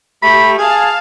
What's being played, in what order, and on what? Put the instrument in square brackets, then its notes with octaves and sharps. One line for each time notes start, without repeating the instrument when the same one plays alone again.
[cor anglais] A3 [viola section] G4 [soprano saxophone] B5
[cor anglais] G#4 [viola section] F5 A5 [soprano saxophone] G#5